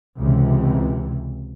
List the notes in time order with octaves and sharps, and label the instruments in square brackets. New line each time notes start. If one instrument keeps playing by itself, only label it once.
[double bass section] C#2 C3 E3